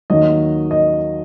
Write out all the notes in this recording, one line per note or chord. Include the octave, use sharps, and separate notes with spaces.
D#2 D#3 F#3 D#5
D#5